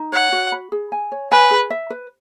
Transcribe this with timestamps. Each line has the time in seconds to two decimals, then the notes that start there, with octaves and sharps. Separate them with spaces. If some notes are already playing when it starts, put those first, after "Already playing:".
Already playing: D#4
0.12 C#5 F#5
0.32 F#4
0.52 B5
0.72 G#4
0.92 G#5
1.12 C#5
1.32 B4 G#5
1.51 G#4
1.70 E5
1.90 B4